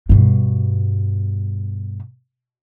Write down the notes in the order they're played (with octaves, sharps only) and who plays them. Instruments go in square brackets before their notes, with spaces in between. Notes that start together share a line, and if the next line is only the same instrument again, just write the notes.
[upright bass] G2 B2